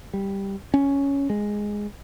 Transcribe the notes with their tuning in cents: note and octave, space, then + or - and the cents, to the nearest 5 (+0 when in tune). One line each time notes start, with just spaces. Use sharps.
G3 +5
C#4 +5
G#3 -5